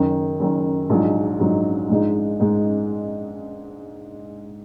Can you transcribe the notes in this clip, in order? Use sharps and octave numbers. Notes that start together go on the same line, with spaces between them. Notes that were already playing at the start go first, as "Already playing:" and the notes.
Already playing: F#1 F#2 D#3
F#1 F#2 D#3
A#1 G#2 F#3 D#4
A#1 G#2 F#3 D#4
A#1 G#2 G#3 D#4
G#2 G#3 D#4